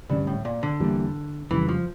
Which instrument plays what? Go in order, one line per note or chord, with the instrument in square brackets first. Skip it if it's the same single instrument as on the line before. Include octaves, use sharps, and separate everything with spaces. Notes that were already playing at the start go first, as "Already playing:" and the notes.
[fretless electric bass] D2 D3 G3 C#4 [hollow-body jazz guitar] G2
[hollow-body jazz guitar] A2
A#2
D3
[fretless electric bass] E2 E3 G3 A#3
[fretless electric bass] F2 C#3 G3 [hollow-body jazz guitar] E3
[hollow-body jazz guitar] F3